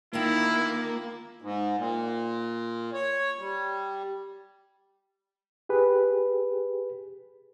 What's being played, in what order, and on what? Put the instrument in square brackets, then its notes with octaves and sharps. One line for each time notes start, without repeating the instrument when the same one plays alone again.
[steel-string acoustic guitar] D3 D#3 F4 [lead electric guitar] A#3 [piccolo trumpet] E4
[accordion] G#2
A#2
C#5
G3
[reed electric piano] G4 G#4 B4